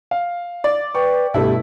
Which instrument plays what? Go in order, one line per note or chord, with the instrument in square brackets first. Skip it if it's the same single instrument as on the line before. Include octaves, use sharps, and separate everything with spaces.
[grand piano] F5
[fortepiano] D5
[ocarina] B4 [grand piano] G5 C#6
[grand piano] G2 B2 A3 [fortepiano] E4 [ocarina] G4